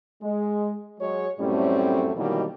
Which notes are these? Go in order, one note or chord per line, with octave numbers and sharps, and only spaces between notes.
G#3
F#3 G#3 C#5
F#2 A2 G3 A3 C4 C#4
B2 D#3 E3 F#3 G3 A#3